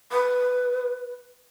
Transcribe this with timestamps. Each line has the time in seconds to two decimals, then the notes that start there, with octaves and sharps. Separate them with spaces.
0.11 B4